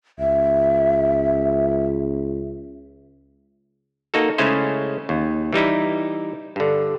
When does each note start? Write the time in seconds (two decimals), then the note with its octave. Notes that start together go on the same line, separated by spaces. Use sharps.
0.19 C#2 E5
4.14 A#3 D#4 F#4 A4
4.38 C#3 G#3 A3 C#4 E4 C5
5.09 D#2
5.53 E3 G3 D#4 E4
6.56 G2 D3